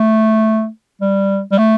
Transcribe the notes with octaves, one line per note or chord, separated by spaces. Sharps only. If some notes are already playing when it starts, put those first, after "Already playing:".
Already playing: A3
G3
G3
A3